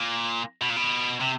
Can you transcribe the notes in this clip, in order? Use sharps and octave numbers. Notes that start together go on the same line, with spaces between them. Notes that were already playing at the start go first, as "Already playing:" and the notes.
Already playing: A#2
B2
A#2
B2
C3